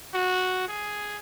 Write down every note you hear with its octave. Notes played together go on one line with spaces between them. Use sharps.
F#4
G#4